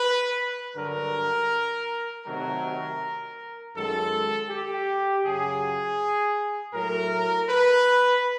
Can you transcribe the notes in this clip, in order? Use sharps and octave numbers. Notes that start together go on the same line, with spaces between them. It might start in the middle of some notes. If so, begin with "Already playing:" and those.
Already playing: B4
G2 D3 F#3 A#4
C3 D#3 F#3 A3 A#4
F#2 D#3 G#3 A4
G4
F#2 C#3 F#3 G#4
A2 F#3 A3 A#4
B4